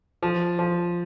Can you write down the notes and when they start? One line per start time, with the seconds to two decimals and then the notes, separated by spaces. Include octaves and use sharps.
0.23 F3
0.59 F3